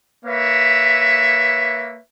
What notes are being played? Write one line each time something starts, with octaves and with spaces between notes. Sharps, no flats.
A#3 B4 C#5 E5